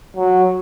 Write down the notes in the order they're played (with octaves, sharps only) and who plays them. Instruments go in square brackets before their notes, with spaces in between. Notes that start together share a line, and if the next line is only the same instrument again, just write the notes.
[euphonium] F#3